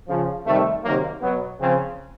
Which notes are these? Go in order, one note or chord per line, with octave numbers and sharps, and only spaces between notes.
C#3 F3
C3 D#3 G3 A3
C3 D#3 F#3 A#3
B2 F#3 B3
C#3 F3 C4